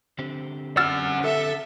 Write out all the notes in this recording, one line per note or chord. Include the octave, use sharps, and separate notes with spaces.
D3 C4 G4
C#4 F#5 E6 F6 A6
A4 E5